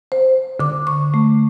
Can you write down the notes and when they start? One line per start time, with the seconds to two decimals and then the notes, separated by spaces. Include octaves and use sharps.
0.12 C5
0.60 D3 D6
0.87 C#6
1.14 A3